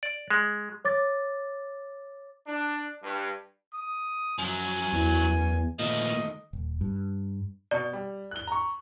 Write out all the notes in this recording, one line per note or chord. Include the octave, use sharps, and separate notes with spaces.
D5
G#3
C#5 D6 A6
D4
G2
D#6
F#2 F3 F#3 G#5
E2
A#2 D#3 F3 A3 B3 D#5
D#1
G2
B2 D5
G3
F#6 G7
A#5 C#6